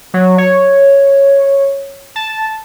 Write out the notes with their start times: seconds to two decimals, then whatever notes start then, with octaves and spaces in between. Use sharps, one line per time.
0.14 F#3
0.38 C#5
2.16 A5